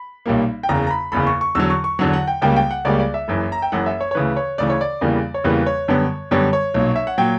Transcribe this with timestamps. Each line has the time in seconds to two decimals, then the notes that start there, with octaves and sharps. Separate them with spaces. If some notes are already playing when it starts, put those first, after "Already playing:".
Already playing: B5
0.26 B1 A#2 G3 A#3
0.63 G5
0.69 F#1 E2 C#3 A#5
0.87 A#5
0.91 B5
1.12 F#1 E2 C#3 B5
1.27 C#6
1.41 C#6
1.55 E2 D3 F#3 E6
1.70 C#6
1.84 C#6
1.99 E2 D3 F#3 F#5
2.13 F#5
2.27 G5
2.42 C#2 C#3 G3 A#3 G5
2.56 G5
2.71 F#5
2.85 C#2 C#3 G3 A#3 D5
3.00 D5
3.14 E5
3.28 F#1 F#2 E3
3.52 A#5
3.62 G5
3.72 F#1 F#2 E3 F#5
3.86 E5
4.01 C#5
4.11 C#5
4.15 D2 C#3 E3 B4
4.37 C#5
4.58 D2 C#3 E3 D5
4.70 C#5
4.81 D5
5.01 E2 C#3 E3 G3 A#3
5.34 C#5
5.44 E2 C#3 E3 G3 A#3 B4
5.66 C#5
5.88 F#2 D3 G3 B3
6.31 F#2 D3 G3 B3 C#5
6.53 C#5
6.74 B1 A#2 F#3
6.96 E5
7.07 F#5
7.18 A#2 F#3 G5